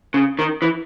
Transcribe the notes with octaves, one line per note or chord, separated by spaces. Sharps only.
C#3
D#3
E3